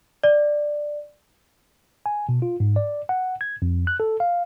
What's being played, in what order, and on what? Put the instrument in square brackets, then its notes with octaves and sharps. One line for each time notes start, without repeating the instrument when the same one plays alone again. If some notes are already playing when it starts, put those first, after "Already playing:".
[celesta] D5
[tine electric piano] G#5
B2
F4
G#2
D5
F#5
G#6
F2
F#6
A4
F5